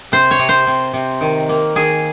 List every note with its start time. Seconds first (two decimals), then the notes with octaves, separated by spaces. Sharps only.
0.12 C3 C5
0.31 C#5
0.39 C3
0.49 C5
0.67 C3
0.93 C3
1.21 D#3
1.49 A#3
1.75 D#3 G#4